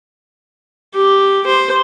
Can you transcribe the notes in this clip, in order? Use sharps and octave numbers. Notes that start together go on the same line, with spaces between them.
G4
C5